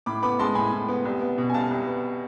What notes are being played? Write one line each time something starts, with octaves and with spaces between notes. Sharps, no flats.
A2 B5 D6
B3 B5 D6
G#3 A5 C6
A2 G#5 B5
A2
B3
C2
B3
B2
G#5
C2 F5 A5
C2
B3